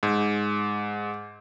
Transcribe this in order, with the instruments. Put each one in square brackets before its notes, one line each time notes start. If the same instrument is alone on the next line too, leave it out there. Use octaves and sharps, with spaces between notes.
[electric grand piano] G#2